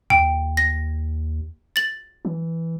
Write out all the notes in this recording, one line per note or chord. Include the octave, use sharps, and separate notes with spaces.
D#2 G5
A#6
A6 F#7
E3